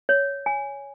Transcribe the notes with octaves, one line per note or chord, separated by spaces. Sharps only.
C#5
G#5